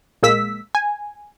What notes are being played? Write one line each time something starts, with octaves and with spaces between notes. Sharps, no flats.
A#1 G#3 A#3 E6 B6
G#5